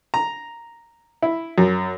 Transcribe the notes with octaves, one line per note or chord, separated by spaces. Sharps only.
A#5
E4
F#2